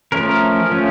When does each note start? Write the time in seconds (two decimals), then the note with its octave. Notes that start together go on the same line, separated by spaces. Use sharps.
0.12 F3 A3 C#4 A#4
0.71 F3 A3 C#4